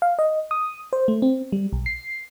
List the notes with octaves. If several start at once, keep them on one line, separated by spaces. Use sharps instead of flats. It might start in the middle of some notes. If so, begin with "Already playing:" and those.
F5
D#5
D#6
C5
A3
C4
G3
B1
C7